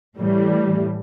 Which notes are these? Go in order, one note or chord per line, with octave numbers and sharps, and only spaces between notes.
A2 E3 G3